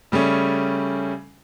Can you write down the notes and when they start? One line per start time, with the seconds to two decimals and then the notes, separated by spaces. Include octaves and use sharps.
0.12 C#3 G3 A3 C#4